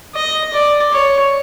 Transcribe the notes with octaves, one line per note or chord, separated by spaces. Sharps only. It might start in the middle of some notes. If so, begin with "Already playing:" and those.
D#5
D5
C#5